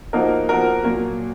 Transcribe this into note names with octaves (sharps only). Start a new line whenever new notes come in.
F3 A#3 D#4 F#4 A#4
F3 B3 F#4 A#4
A#2 F#3 A#3